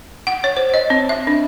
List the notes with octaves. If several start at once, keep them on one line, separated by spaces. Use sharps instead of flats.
F#5
C#5
C5
D#5
C4
E5
D4